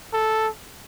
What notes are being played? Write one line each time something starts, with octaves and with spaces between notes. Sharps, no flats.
A4